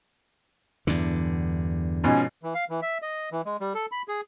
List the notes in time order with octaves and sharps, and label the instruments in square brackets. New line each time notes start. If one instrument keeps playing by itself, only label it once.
[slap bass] E2 G2 D3
[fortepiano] G#2 B2 F3 [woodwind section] C#4
[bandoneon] E3
F5
E3
E5
D#5
E3
G#3
G3
A4
B5
G#4